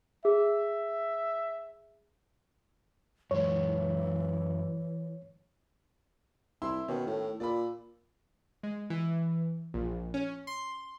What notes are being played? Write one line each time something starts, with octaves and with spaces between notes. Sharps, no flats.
G#4 E5
F#2 E3 G#3 C#5
C2 E4 C6 E6
B2 D#3 C#4
A2
A#2 D5 B5
G#3
E3
A#1
C#4
C6